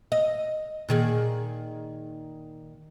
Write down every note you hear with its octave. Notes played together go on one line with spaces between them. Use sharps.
D#5
A#2 D#3 G#4